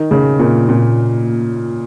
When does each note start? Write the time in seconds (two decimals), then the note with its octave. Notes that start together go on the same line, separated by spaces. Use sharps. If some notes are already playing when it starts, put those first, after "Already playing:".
Already playing: D#3
0.11 C#3
0.40 A#2
0.69 A#2